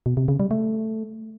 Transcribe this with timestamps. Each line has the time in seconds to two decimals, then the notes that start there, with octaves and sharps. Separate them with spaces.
0.06 B2
0.17 C3
0.28 C#3
0.40 G3
0.51 A3